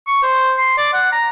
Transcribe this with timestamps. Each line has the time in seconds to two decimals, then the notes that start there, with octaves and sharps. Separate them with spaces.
0.07 C#6
0.23 C5
0.58 C6
0.78 D5
0.93 F#5
1.12 A#5